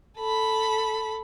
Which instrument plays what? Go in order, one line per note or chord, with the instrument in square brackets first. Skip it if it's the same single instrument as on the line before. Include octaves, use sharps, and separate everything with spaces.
[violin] A4 B5